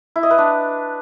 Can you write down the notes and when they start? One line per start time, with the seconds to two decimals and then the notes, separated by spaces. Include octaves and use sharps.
0.16 E4
0.23 D#5
0.31 B4
0.38 D4